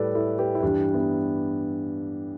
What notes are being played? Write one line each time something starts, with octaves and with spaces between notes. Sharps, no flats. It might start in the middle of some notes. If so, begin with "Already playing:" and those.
Already playing: A2 G3 A4 B4 D5
E4 A4
G4 B4
E4
G2 E3 G3 D4 G4
B3 E4